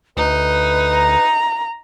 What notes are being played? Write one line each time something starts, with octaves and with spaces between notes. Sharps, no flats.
D2 D#4 B4
A#5